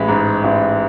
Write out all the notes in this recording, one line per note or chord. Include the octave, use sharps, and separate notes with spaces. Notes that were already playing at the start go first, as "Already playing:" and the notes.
Already playing: A1 G#3 B5
G#2
A1